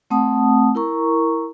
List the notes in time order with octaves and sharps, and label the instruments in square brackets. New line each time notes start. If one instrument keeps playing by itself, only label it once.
[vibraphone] A3 C4 F#5 A5 D#6
E4 A#4 A#5 C#6